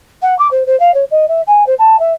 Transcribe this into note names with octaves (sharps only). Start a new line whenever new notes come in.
F#5
D6
C5
C5
F5
C#5
D#5
E5
G#5
C5
A5
E5